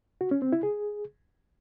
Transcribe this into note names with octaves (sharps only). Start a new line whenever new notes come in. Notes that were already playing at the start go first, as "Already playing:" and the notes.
F#4
C#4
C4
E4
G#4